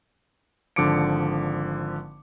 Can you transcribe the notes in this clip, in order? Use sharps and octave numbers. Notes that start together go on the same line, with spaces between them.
G#1 D3 F3 D6 C#7 D7